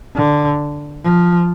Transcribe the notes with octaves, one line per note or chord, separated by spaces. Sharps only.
D3
F3